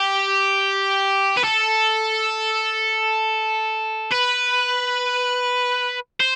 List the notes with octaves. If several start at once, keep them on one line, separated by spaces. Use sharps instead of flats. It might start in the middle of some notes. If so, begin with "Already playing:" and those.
Already playing: G4
B4
A4
B4
C5